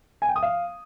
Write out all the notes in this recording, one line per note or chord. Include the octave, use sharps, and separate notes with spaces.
G#5
G5
D#6
F5